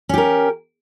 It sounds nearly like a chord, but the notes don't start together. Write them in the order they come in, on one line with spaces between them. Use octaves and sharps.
C#4 G4 A#4